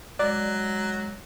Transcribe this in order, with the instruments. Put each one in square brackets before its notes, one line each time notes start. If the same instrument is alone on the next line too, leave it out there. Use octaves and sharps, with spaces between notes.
[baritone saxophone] F#3 [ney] G#3 [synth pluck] D5